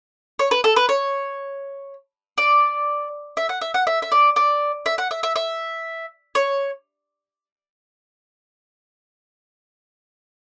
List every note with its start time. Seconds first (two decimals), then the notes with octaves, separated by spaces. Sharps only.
0.39 C#5
0.51 B4
0.64 A4
0.76 B4
0.89 C#5
2.38 D5
3.37 E5
3.49 F#5
3.61 E5
3.74 F#5
3.87 E5
4.02 E5
4.12 D5
4.36 D5
4.86 E5
4.98 F#5
5.11 E5
5.23 E5
5.36 E5
6.35 C#5